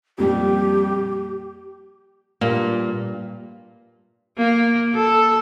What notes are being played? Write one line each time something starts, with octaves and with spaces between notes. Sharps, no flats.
F2 A#2 G3 G4
G2 A#2 A#3
A#3
A4